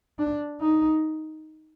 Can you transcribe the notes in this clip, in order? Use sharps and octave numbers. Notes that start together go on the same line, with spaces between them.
D4
D#4